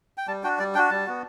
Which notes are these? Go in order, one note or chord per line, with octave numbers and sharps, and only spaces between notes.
G5
G3 A5
D4 F#4 G5
G3 D5
D4 F#4 G5
G3 A5
B3 F#4